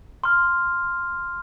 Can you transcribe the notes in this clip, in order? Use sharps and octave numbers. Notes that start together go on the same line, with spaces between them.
C6 F6